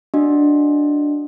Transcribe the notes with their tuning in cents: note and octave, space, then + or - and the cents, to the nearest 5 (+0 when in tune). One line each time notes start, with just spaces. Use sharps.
D4 +0 F#4 +0 D#5 +0